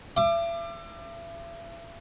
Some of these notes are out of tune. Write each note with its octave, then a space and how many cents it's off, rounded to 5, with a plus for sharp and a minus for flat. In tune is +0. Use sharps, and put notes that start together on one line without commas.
E5 +40 D6 +25